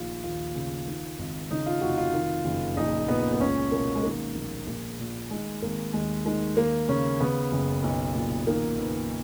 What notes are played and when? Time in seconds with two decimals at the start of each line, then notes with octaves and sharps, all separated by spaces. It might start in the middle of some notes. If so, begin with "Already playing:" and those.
Already playing: A#1 D#3 F4
0.23 D#2 F4
0.55 C#3
0.87 D#3
1.19 G#1
1.51 C#3 D#4
1.66 F4
1.81 F1 F#4
1.98 F4
2.13 D#3
2.45 F#1
2.77 A#1 D#4
3.08 A#2 B3
3.33 B3
3.40 C#2 C#4
3.72 B2 A#3
3.95 G#3
4.03 D#3 A#3
4.35 A#1
4.67 A#1
4.99 A#2
5.30 D#3 G#3
5.62 G#1 A#3
5.93 D#2 G#3
6.25 D#3 G#3
6.57 D#2 A#3
6.88 C#3 C#4
7.20 C#3 B3
7.52 F#1
7.84 B1
8.15 A#2
8.47 D#3 A#3
8.79 F#1 B3